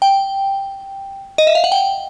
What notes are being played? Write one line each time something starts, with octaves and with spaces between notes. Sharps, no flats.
G5
D#5
E5
F5
F#5
G5